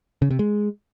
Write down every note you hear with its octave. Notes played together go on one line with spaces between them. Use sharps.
C#3
C3
G#3